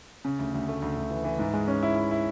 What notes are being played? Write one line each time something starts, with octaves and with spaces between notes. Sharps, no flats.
C#3
D2
D2
A3
D2
D2
E3
E3
G#2
G#3
C#4
E4
E4
E4